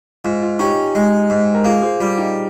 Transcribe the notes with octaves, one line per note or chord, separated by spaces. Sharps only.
G#2 F4
F4
C#4 D#4 G4
G#3
G#2
A#4
A#3 F4 G#4
G#4 C5
G3 F4 G#4
D#4 G4